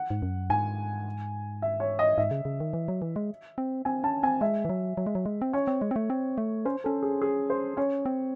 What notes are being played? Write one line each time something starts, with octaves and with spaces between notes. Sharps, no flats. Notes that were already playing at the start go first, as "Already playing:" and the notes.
Already playing: F#5
G#2
F#2
G#2 G#5
E5
C#5
D#5
G#2 E5
C#3
C#3
D#3
E3
F#3
E3
G#3
C4
C4 G#5
C#4 A5
C4 G#5
G#3 E5
E3
F#3
F#3
G#3
F#3
G#3
C4
C#4 C#5
C4
G#3
C4
A3
C4
A3
C#4 C5
C#4 A4
G#4
G#4
C5
C#4 C#5
C4